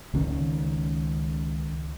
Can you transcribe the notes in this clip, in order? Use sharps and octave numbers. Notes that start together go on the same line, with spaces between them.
C#2 D#3 C#4